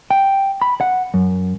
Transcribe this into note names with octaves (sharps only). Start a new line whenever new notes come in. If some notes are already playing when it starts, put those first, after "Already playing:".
G5
B5
F#5
F#2